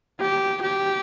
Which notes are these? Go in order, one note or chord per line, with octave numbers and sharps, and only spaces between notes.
G4
G4